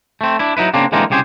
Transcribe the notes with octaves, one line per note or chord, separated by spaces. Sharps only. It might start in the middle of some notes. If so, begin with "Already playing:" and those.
A3 C4
D4 E4
F#3 D#4 E4 B4
C#3 A#3 C4 D4
D3 E3 G#3 A#3 C4 D#4
C2 C#3 G4 G#4 C5